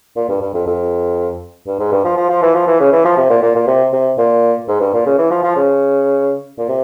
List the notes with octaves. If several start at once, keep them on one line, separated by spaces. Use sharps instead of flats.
A#2
G2
G2
F2
F2
G2
G#2
G2
F3
F3
F3
E3
F3
E3
C#3
E3
F3
C3
A#2
A#2
A#2
C3
C3
A#2
G#2
G2
A#2
C#3
E3
F3
F3
C#3
A#2
C3